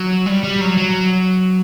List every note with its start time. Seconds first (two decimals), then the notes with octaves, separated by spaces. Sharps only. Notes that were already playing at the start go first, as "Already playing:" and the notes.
Already playing: F#3
0.26 G3
0.44 G3
0.61 F#3
0.77 F#3